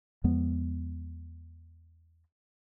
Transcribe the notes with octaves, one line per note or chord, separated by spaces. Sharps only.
E2 F3 G#3 B3